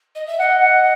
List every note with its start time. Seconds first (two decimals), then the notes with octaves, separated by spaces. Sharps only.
0.15 D#5
0.27 E5
0.39 D#5 F#5
0.62 F#5